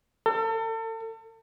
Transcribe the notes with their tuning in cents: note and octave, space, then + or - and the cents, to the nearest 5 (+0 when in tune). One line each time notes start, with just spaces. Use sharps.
A4 +35